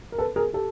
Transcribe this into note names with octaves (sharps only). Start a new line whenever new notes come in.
A#4
A4 B4
G#4 A#4
G4 A4